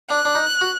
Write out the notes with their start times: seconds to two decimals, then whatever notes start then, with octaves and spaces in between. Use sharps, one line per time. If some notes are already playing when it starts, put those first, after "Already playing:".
0.10 D4 F#6
0.25 D4
0.35 D#4
0.61 F#4